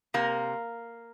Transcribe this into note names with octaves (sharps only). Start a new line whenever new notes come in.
C3 A#3